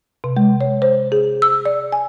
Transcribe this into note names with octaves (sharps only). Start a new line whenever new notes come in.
C3
G#3
C#5
C5
G#4
E6
D5
G#5